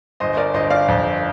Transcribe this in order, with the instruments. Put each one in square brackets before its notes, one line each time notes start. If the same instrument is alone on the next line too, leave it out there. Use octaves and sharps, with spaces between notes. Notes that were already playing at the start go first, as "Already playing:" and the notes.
[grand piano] G1 [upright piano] C5 D#5
[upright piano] A#4 D5
[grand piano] G1 [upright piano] C5 D#5
[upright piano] D5 F5
[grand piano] F2